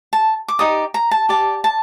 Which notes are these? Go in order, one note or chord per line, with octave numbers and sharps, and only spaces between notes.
A5
D6
D#4 G4 D5 D#6
A#5
A5
G4 D5 A5
A5